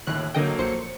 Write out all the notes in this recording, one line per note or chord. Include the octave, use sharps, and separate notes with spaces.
D#1 D#2 A2 F#6
D3 F#3 A#3 A4 D#5 G5
A#1 C5 C#7